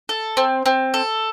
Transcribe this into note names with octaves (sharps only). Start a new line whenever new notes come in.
A4
C4
C4
A4